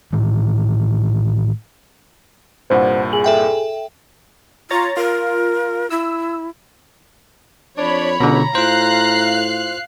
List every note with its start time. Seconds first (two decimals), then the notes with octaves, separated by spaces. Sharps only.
0.13 A2 D#3 E3
2.70 C2 G2 A#2 C5 F#5
3.13 G#4 G#5 F#7
3.24 A4 E5 G5
4.70 F4 C#5 A#5 A6
4.97 F4 A#4
5.90 E4 E6
7.78 F2 D4 C#5 B5
8.20 C#2 B2 D3 A#5
8.55 A2 F4 C5 F5 F#6 C7